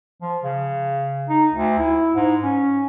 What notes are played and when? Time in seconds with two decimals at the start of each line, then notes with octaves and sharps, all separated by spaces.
0.22 F3
0.44 C#3
1.29 D#4
1.54 D2
1.79 E4
2.15 G#2
2.43 C#4